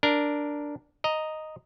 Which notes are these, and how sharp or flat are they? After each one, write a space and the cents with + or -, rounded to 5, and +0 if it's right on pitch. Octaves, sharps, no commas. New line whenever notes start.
D4 +0 A#4 +0
D#5 +0 A#5 +0